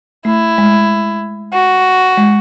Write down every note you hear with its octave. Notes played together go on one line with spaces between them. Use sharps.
A3 E4
G#3
F#4
G#3